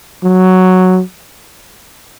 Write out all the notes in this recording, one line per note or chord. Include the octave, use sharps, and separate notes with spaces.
F#3